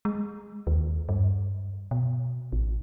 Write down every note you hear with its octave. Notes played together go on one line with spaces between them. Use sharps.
G#3
D#2
G2
B2
A1